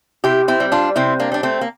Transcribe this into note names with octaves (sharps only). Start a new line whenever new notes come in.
C3 E4 G4
C4 E4
G3
D4 F4
C3 C4 E4
A#3 D4
G3 D4
A3 C4
A#3